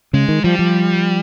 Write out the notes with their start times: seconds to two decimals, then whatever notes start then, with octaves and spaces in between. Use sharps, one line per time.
0.14 C#3 G#3
0.28 D#3
0.44 F3 G3
0.59 F3